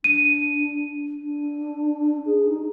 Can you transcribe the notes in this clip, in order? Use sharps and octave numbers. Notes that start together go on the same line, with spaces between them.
D4 D#7
D4
G#4
D#4